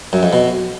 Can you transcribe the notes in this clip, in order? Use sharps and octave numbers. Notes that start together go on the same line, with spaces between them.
F#2
F2
B2